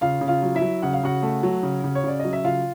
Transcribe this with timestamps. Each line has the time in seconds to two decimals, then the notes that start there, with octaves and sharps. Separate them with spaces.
0.01 C#3 F4 F5
0.21 C#3
0.28 F4 F5
0.43 F#3
0.55 E4 E5
0.62 F#3
0.82 C#3 F#5
0.93 F5
1.03 C#3 F#4 F#5
1.23 A3
1.43 F#3
1.63 C#3
1.84 C#3
1.95 C#5
2.04 C#3 D5
2.20 F#3 D#5
2.33 E5
2.44 C#3 F4 F5